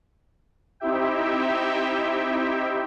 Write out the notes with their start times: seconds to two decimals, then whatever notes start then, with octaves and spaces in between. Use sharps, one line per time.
0.80 C4 D#4 E4 G4 E5 G5